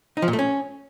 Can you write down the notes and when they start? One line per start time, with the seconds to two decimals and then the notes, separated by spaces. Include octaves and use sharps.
0.17 D#4
0.22 F3
0.28 A#2
0.33 A3
0.39 C#4